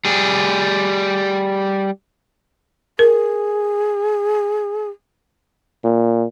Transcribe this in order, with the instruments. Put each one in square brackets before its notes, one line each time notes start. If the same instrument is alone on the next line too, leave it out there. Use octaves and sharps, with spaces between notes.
[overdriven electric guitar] G3 G#4
[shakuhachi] G#4 [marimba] A#4
[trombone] A#2